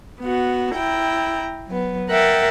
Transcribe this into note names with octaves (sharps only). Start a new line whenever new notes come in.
B3 F#4
E4 G5 A#5
F#3 B3
A#4 E5 F#5 G5 A6